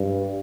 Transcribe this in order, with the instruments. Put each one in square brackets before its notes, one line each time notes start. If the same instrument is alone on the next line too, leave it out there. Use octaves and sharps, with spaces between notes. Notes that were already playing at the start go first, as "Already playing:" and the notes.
Already playing: [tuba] G2